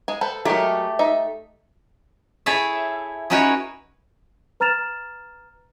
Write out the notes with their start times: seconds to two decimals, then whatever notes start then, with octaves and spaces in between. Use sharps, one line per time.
0.08 G#3 G#5
0.21 A4 B4 C5
0.45 F#3 G#3 A3 G4 A#4
0.99 D#4 E5
2.46 E4 G#4 A4 C#5 E5
3.30 C#4 D#4 E4 F#4 B4 C#5
4.60 B4 A#5 F6 A6 E7 F7